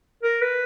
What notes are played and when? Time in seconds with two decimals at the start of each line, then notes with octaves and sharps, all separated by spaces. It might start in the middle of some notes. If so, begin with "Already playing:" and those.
0.23 A#4
0.42 B4